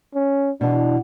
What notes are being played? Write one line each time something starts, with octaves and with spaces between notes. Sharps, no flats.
C#4
B2 E3 D4